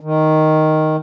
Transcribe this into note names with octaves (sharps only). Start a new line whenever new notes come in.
D#3